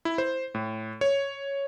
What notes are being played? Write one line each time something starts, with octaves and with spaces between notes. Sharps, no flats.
E4
C5
A2
C#5